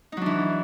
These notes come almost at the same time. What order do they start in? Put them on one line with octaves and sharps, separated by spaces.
D#4 F#3 D4 E3